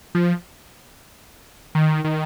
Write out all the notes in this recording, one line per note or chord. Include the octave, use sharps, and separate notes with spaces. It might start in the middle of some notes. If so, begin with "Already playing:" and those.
F3
D#3
D#3